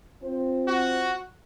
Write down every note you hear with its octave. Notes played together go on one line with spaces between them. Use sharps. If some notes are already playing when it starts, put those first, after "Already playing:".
C4 F4 C5
F#4